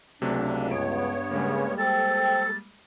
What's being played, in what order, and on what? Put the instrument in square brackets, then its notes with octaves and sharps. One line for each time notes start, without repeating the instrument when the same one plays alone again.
[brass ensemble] C#2 [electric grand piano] C3 F#3 A3 [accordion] D4
[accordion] G2 B3 C#5 [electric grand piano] D7
[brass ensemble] C#3 [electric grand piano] G3 G#3 A#3
[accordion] A4 [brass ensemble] C5 G5 [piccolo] A6